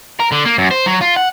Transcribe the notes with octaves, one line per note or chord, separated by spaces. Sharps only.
A#4
D3
A#3
F#2
C5
F#3
F4
F#5